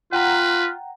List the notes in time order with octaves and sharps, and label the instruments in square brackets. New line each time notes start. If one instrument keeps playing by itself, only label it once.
[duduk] F4 [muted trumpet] B4 [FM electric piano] F#5 G5 A#5